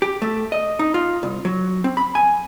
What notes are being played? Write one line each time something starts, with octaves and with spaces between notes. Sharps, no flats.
G4
A3
D#5
D#4
F4
C2
F#3
C4
B5
G#5